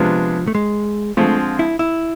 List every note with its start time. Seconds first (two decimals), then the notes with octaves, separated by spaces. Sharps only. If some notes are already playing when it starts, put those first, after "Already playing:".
Already playing: C3 F3 G#3 B3 D4 F4
0.47 A3
0.55 G#3
1.17 D3 F3 G#3 A3 C4 F4
1.59 E4
1.79 E4